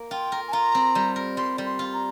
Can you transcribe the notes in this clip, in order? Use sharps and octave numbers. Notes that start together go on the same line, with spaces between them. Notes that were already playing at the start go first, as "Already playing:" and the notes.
Already playing: A#3
F4 G5
A#4
G#5
F4 A#5
C4
G3
A#4
G3 C6
G3
C6
F4
A#5